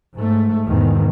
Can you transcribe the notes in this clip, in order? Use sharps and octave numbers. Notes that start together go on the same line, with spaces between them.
G#2 A3
E2 G#2 B2 D#3